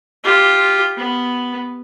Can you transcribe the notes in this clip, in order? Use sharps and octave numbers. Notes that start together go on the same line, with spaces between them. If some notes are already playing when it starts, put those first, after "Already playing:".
F4 G4
B3